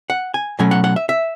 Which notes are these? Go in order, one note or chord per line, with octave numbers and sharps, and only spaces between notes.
F#5
G#5
B2 F#3 A3 C#4 G#5
F#5
F#5
E5
E5